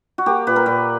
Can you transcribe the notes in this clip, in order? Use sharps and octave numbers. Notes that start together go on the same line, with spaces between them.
F#4
A#3 G4
A#2 B4
A#4
A#2 B4